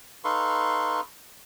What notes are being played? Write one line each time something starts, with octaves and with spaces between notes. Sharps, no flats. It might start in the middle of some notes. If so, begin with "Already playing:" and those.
D#4 A4 B4 F5 C6 C#6